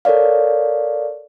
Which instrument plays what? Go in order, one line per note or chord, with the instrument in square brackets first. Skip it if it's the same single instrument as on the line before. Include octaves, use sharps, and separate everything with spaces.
[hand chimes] A4 A#4 C#5 D5 F5